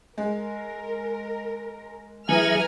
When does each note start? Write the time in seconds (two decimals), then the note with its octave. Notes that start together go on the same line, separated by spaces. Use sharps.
0.18 G#3 A#4
2.29 E3 F#3 G#4 B4 E5 G#5 A#5 F6